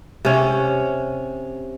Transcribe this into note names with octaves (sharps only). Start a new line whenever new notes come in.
C3 C#4